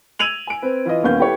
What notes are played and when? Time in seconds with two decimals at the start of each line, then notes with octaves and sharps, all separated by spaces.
0.19 E6 G#6 D#7 F7 F#7
0.47 G#5 D7
0.62 C4 B4
0.85 E3 F4 D#5
1.03 D#1 D#2 B3 C#4 F5 G6
1.19 E4 G4 A4 B4 C#5